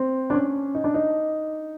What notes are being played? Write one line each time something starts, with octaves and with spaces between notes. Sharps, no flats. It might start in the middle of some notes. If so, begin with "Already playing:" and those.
Already playing: C4
D4
C#4
D#4
D4
D#4